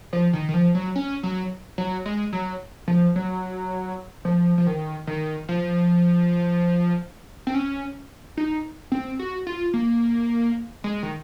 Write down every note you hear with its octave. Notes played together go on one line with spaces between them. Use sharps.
F3
D#3
D#3
F3
F#3
C#4
F#3
F#3
G#3
F#3
F3
F#3
F3
F3
D#3
D#3
F3
C4
C#4
D#4
C4
F#4
F4
A#3
G#3
D#3